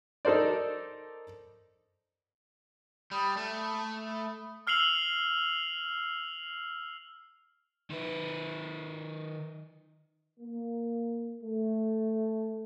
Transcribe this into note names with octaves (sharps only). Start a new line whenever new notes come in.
D#4 A4 A#4 C5 D5
G3 B5 D#6
A3
E6 F6 C7 F7 F#7
D#3 B4
A#3
A3